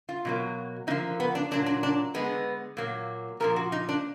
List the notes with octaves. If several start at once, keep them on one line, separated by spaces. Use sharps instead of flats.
F4
B2 F#3 A#3
D3 F3 A#3 D#4
B3
D4
A#2 F#3 A#3 D4
D4
D4
D3 G#3 B3
A#2 F#3 A#3
A#2 F3 A#3 A#4
F#4
D#4
D4